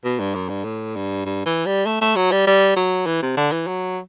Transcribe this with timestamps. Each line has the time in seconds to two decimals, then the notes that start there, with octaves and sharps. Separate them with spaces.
0.05 B2
0.19 G2
0.35 F#2
0.49 G2
0.64 A2
0.96 G2
1.26 G2
1.46 E3
1.66 G3
1.86 A3
2.01 A3
2.16 F#3
2.32 G3
2.47 G3
2.77 F#3
3.06 E3
3.22 C3
3.37 D3
3.52 E3
3.67 F#3